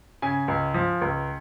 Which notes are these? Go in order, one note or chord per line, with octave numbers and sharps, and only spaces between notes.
C#3 G#5
C#2
F3
C#2